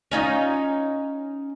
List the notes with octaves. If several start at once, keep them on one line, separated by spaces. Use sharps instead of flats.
C#4 D#4 F4